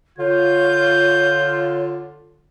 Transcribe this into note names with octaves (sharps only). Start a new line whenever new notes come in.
D3 F4 C#5 G6